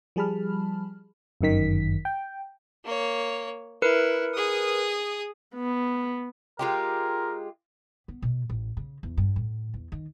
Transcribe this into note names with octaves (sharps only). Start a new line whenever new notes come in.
F3 G3 G#4 A5 B5 F6
G1 F#2 D#3 B6
G5
A#3 C#5
E4 A#4 B4 C#7
G#4 D#6
B3
G#3 F4 G4 A#4
B3
B2
A1
C#3
E2
G2
A2
E2
D#3